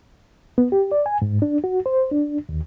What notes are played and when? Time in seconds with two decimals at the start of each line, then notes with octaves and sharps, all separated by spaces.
0.58 B3
0.72 G4
0.92 D5
1.06 G#5
1.22 G#2
1.42 D4
1.64 F#4
1.86 C5
2.12 D4
2.49 D#2